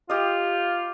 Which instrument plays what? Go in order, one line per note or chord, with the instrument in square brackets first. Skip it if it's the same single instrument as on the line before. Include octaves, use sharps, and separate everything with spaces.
[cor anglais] F4 [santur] G4 D#5